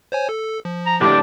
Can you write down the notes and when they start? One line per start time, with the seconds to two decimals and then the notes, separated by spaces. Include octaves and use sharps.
0.12 C5 C#5 G#5
0.29 A4
0.65 F3
0.86 A#5
1.01 A2 D4 G4